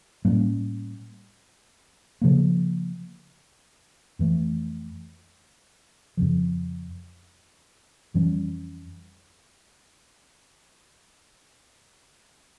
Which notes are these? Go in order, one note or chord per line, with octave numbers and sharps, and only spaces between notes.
A2 G3 A#3 C#4
C#3 F3 A#3
F2 E3 A3
F2 C#3 F3
F2 E3 G3 C#4